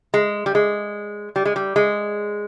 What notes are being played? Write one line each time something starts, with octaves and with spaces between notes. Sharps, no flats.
G#3
G3
G#3
G3
G#3
G3
G#3